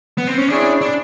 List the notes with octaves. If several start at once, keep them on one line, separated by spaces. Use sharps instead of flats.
B3
C4
C#4
C4 D4 E4 G#4 C#5
D4